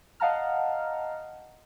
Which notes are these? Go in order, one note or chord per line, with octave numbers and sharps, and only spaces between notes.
D#5 F5 F#5 A5 A#5 F6